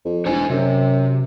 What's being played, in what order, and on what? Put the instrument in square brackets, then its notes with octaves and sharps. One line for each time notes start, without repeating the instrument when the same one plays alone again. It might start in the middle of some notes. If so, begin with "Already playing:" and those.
[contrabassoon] F2
[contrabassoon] E1 [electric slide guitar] D#4 C5 G#5
[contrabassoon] F#2 [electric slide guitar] C3